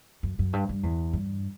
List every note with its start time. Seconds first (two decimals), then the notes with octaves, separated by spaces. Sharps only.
0.23 F#2
0.39 F#2
0.53 G2
0.69 G2
0.83 E2
1.13 G2